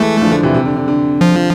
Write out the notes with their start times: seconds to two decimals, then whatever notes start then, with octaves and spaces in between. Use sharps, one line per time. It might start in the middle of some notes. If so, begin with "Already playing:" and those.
Already playing: E3 G#3 A3
0.21 D3 F3
0.32 D3 F3
0.43 C3 E3
0.54 C3
0.65 D3
0.77 D3
0.88 D3
1.21 F3